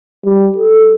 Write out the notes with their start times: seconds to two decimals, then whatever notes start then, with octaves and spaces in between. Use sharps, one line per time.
0.25 G3
0.58 A4